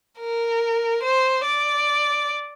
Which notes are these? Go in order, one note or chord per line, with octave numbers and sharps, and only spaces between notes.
A#4
C5
D5